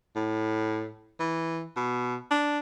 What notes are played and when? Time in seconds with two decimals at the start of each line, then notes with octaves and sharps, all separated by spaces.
0.16 A2
1.20 E3
1.76 B2
2.31 D4